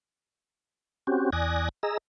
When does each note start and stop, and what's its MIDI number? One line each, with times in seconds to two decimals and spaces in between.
1.07 1.30 60
1.07 1.30 61
1.07 1.30 66
1.07 1.30 67
1.33 1.69 40
1.33 1.69 74
1.33 1.69 80
1.33 1.69 87
1.33 1.69 90
1.33 1.69 94
1.83 1.98 68
1.83 1.98 75
1.83 1.98 82
1.83 1.98 88